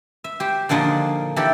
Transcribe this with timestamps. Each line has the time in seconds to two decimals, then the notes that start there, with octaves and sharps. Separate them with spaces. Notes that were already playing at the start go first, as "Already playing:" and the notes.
0.24 E5
0.40 G4 C5
0.69 A#2 D3 F3 D4 D#4 G#4
1.36 E3 D4 G4 A4